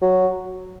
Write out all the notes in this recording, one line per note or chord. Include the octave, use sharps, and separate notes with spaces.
F#3